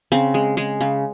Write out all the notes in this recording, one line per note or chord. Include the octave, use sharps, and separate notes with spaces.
C#3 C4
G#3
G#3
C#3